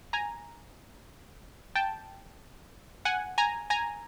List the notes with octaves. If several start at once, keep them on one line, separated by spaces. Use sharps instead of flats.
G#5 A#5
G5 A5
F#5 G#5
G#5 A#5
G#5 A#5